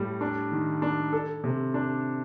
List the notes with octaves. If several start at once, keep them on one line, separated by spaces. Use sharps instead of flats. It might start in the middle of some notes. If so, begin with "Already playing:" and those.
Already playing: A2 G3
D4
D#3
D4
A4
C3
D4